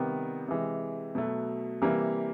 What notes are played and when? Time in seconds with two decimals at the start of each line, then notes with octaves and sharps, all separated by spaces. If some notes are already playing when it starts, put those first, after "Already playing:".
Already playing: C3 D#3 G3 B3
0.48 C3 E3 G#3
1.15 B2 F#3 A3
1.82 C3 E3 G3 A#3